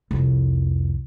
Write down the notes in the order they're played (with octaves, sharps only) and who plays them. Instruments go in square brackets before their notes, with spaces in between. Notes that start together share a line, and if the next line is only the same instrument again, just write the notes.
[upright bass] C2 F2